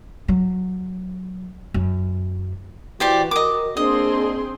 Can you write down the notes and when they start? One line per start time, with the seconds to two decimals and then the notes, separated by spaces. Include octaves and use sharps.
0.28 F#3
1.74 F#2
3.00 E3 F#4 G4 C5 D5
3.31 A#4 D#5 D6
3.77 A#3 C4 D4 G#4 D#5 C6